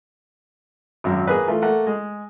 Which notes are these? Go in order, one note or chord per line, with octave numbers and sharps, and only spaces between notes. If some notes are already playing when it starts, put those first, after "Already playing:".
G#1 F#2
A#3 G#4 A#4 B4
E3 A3 F4
A3 A#3 F#5
G#3 G#4